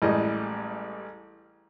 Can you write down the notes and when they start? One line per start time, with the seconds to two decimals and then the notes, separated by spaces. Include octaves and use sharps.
0.02 A1 E3 G3 G#3 D#5 D#6